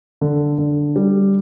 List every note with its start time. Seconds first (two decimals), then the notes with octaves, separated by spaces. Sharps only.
0.21 D3
0.58 D3
0.96 G3